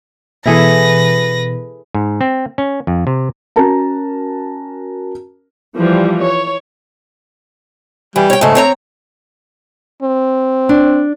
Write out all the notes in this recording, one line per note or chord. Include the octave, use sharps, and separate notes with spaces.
B2 E3 E4 G#4 A4 B4 A#6
G#2
C4
C#4
F2
C3
C#4 F#4 A#4 A5 A#5
E3 F3 G3
C#5
E3 G3
C#5 G5
G#2 C#3 A3
C4 C#5 A#5
C4
D4